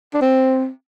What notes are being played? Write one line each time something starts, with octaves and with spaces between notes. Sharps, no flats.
D4
C4